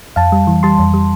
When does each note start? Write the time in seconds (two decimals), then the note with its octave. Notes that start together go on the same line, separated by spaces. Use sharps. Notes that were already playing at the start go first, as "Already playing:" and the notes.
0.16 F2 F5 A5
0.32 G3
0.47 E3
0.63 G3 A5 C6
0.79 F2
0.94 G3